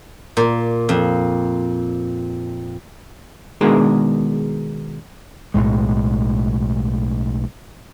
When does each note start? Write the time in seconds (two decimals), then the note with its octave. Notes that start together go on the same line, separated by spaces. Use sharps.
0.37 A#2
0.89 F2
3.61 B2 D#3 G#3 D4 G#4 A#4
5.54 B1 F#2 A2 G#3